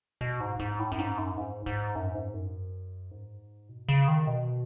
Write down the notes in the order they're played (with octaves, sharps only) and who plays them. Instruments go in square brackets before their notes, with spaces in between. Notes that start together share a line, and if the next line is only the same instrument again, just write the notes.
[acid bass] B2
G#2
G#2
A2
F#2
G#2
F#2
G#2
G#2
F#2
G#2
F#2
G#2
B2
C#3
D#3
B2